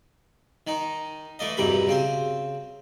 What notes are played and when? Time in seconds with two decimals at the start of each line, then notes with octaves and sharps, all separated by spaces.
0.67 D#3 D#4
1.39 E3 A3 D5 D#5
1.57 B1 E2 G2 C3 A#4 B5
1.87 C#3 C4 C5